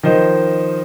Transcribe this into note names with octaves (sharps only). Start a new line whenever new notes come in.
D#3 F3 C5 D#5